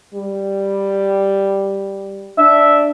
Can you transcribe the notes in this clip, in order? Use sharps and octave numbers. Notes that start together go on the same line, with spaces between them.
G3
D4 E5